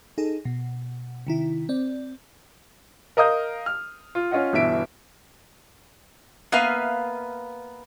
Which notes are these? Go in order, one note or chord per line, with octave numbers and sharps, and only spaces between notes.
D#4 G#4 A4
B2
C3 D#3 E4
C4 D5
A#4 D#5 F5 D#6 G6
F6
F4
C#4 F4 D#5 F#5
G1 B2 E3 E5 D7
A#3 B3 B4 E5 F5